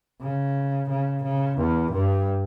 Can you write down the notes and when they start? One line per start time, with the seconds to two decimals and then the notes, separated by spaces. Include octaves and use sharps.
0.21 C#3
0.90 C#3
1.24 C#3
1.58 E2
1.92 G2